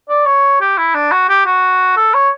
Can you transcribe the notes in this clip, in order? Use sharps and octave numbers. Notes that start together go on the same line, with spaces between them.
D5
C#5
G4
E4
D4
F#4
G4
F#4
A4
C#5